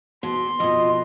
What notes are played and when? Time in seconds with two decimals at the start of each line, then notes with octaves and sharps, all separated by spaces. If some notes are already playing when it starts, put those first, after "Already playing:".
0.23 B2 C6
0.60 F2 B2 F4 D#5